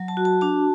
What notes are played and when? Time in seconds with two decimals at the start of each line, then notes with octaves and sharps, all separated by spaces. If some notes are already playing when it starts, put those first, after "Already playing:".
Already playing: F#3
0.08 A5
0.17 F#4
0.25 A5
0.41 D4 A5